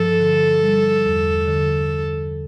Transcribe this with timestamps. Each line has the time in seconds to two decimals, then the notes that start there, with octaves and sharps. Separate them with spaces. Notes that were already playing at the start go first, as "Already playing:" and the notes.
Already playing: G2 F3 A4
0.20 D3
0.62 G3
1.05 E2
1.47 D3